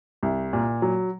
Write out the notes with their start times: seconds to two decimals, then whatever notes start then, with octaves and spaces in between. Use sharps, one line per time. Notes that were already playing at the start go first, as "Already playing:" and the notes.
0.23 C2
0.53 A#2
0.82 F#3